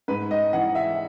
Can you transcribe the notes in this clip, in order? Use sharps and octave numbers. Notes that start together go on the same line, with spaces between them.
G#2 B4
D#5
E3 F#5
E5